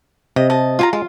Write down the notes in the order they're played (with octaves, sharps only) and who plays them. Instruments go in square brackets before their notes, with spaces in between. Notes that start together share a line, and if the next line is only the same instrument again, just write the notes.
[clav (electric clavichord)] C3 [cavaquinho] D#5
[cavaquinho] D#5 A5
F4 G#5 A#5
[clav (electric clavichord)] G#3 [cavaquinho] F4